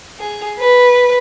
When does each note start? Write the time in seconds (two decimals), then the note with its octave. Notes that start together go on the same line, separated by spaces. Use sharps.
0.19 G#4
0.59 B4